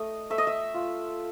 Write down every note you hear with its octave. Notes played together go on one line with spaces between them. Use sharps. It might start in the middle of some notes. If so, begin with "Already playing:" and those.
Already playing: A3 D#5
A3 E5
D#5
E5
F4